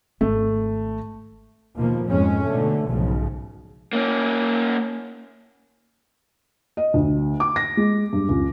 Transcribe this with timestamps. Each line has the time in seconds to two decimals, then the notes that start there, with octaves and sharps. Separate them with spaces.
0.21 G#1 A3
1.76 D#2 B2 F3 A#3
2.06 F2 G#2 G#3 C#4
2.45 B2 D3 A3
2.89 B1 G#2 C#3 F3
3.93 A#3 C#4
6.77 D#5
6.94 D2
7.40 D6
7.56 A#6
7.77 G#3
8.13 G2
8.29 C#2